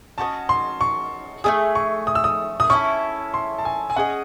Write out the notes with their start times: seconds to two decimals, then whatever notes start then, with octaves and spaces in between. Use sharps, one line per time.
0.18 C#4 F#4 C5 D#5 A5
0.49 C6
0.81 C#6
1.44 A3 C#4 G#4 D#6
1.75 C#6
2.07 D#6
2.15 E6
2.24 D#6
2.60 D#6
2.70 C#4 E4 A4 C#6
3.34 C6
3.58 A5
3.65 G#5
3.90 G#5
3.96 C#4 G#4 D#5 F#5